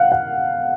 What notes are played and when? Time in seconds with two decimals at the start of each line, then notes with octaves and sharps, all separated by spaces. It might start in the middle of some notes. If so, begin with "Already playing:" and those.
Already playing: F5 F#5
0.12 F#5